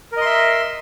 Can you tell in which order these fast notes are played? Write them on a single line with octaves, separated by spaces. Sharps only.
A#4 D#5 C6 E5